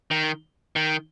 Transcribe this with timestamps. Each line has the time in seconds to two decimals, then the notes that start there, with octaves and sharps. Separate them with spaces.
0.11 D#3
0.76 D#3